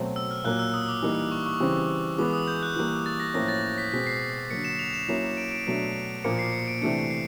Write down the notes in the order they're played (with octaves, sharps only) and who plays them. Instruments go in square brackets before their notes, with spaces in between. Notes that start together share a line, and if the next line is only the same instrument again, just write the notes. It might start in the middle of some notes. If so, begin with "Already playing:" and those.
Already playing: [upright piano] B2 F#3 A3 C4
[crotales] E6
F6
[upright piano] A#2 F#3 A#3 [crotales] F#6
[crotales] E6
D#6
D6
[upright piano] E3 G3 A#3 D#4
[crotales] C#6
C#6
[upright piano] C#3 E3 G3 C4
[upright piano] E3 G#3 B3 [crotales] D6
[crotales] D#6
G6
F#6
[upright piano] E3 G3 A#3
[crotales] A6
A#6
[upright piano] A2 F3 A#3 C#4 [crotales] A#6
[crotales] A6
B6
[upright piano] B2 G#3 C4 [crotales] B6
[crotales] C7
[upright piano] D3 F#3 A#3 [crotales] C#7
[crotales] E7
F7
E7
[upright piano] F#3 A#3 C#4 E4
[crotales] D7
D7
[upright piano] B2 F#3 A3 D4
[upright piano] A#2 F3 A#3 [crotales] C#7
[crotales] C7
C#7
D7
[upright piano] C3 E3 A3 D4 [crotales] C#7
[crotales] C7